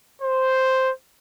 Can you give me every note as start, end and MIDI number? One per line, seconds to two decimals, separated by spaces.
0.22 0.90 72